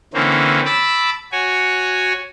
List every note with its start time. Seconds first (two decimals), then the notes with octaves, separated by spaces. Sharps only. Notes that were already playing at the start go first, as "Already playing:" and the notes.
0.14 D3 E3 A#3 C4 C#4
0.65 A5 B5 D6 E6
1.32 F#4 C#5 G#5